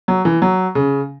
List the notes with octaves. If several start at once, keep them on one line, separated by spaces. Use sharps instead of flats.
F#3
E3
F#3
C#3